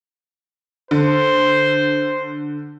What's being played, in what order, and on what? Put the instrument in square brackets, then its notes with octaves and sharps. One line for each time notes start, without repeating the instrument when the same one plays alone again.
[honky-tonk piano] D3 [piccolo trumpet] C5